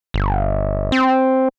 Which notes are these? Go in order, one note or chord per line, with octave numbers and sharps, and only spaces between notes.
G1
C4